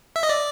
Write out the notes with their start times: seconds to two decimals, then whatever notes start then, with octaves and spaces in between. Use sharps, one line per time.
0.16 E5
0.23 D#5
0.29 D5